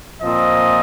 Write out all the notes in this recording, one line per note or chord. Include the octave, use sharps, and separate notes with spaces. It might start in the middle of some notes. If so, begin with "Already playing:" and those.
A#2 F3 C4 D#5